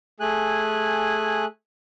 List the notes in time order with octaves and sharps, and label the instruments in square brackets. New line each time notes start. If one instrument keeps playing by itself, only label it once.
[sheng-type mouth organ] A3 G#4 G#5 F#6